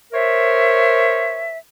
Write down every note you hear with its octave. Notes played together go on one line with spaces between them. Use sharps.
A#4 C5 C#5 E5